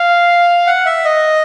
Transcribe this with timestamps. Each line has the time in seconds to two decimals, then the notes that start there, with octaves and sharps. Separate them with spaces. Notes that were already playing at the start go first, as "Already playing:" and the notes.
Already playing: F5
0.67 F#5
0.86 E5
1.05 D#5